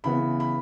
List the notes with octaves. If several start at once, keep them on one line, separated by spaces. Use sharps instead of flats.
C#3 E3 B3 B5
B5